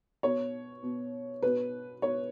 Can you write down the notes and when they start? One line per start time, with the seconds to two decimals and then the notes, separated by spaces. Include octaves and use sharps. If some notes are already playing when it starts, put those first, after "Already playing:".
0.23 B2 C#5
0.83 B2
1.43 B2 B4
2.02 B2 C#5